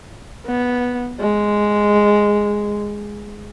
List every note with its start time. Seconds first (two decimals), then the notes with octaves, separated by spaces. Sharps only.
0.46 B3
1.19 G#3